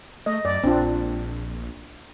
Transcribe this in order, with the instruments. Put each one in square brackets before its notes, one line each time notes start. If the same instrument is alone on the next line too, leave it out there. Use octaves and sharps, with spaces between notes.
[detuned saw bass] A3 [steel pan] D#5
[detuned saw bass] F#2 [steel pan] D5
[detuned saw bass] A#1 [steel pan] C4 D4 F4